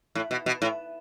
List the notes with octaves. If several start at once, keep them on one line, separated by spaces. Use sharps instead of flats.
A2
B2
B2
A2